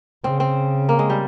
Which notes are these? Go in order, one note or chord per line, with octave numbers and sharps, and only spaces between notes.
C#3 C4
C4
A#3
G#3
G3